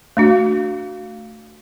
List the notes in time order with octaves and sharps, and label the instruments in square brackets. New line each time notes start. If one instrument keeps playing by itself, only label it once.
[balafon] A3 D4 F#4